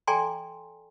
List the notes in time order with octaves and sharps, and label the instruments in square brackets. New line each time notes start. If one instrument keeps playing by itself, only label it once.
[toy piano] A4 D5 G5 G#5 A#5 C6